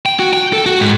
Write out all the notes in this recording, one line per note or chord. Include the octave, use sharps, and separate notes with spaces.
G5
F#4
G5
A4
F#4
G#2